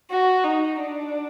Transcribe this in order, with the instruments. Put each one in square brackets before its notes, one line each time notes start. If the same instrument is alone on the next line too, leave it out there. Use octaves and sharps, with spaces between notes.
[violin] F#4
D#4
D4